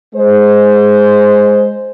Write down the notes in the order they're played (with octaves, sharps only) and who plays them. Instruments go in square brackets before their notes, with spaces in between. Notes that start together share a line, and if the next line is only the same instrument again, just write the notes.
[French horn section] G#3 C5